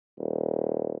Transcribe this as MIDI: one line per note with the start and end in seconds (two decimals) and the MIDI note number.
0.18 0.96 27